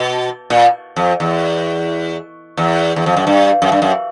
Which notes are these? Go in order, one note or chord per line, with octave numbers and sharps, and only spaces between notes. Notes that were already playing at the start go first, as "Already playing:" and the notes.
Already playing: B2
A#2
F2
E2
E2
E2
F2
F#2
G2
F#2
G2
F#2